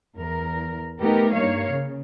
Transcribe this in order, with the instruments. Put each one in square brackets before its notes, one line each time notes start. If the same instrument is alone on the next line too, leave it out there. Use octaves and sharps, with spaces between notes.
[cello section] E2 A#4
A3 B3 D#4 G4 A#4
G2 A#3 C#5 F5
C#3